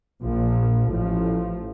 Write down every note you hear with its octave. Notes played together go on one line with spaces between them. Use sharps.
A#1 A#2 F3
A1 A2 F3